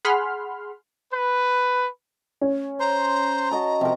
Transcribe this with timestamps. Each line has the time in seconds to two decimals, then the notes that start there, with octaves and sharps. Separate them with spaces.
0.05 G#4 F#5 B5 C6 F6
1.13 B4
2.41 C#4
2.80 C5 A#5 C6
3.51 F#4 D#5 A5
3.81 C3 F3 A#4